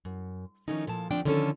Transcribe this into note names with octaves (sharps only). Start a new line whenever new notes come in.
F#2
D#3 F3 A3 C#4 D#4
A#2 F3 A5
D2 F3 C4 D4 D5 G5
D3 D#3 F3 C#4 F4 A4